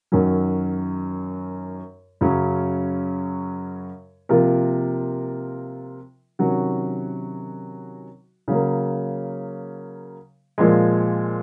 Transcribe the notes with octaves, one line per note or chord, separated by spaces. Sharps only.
F#2 D#3 F#3 C#4
F#2 C#3 F#3 C#4
C3 F3 A#3 F4 A#4
C3 D#3 F#3 C#4 F#4
C#3 F#3 A#3
A#2 F3 G#3